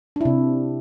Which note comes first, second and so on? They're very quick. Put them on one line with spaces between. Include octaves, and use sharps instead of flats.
D4 E4 C3